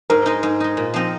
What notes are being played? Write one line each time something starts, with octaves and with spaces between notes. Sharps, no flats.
G#2 A#4
G#3 D#4
G#2
G#3 D#4
A#2
F3 C4 D#4